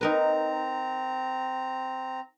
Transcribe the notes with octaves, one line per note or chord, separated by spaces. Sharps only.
C4 D#4 A#4 B4 A#5